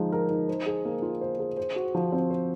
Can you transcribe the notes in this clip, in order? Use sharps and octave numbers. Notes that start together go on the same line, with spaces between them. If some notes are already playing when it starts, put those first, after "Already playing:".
Already playing: F3 G#3 D#4
A#4
D#4
C5
G#4
A#3
F4
C5
G#4
C5
F#4
F3
C4
C5